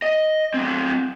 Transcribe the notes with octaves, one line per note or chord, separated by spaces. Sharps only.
D#5
F#3 C4